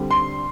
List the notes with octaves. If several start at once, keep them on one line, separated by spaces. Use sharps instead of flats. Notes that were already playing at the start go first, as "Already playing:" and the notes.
Already playing: D3 G3 C4
C6